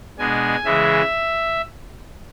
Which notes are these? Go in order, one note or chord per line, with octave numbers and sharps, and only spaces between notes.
B2 G#3 D4 G#5
C#3 E3 G#3 E5